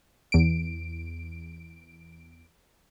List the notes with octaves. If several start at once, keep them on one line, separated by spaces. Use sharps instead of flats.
E2 D7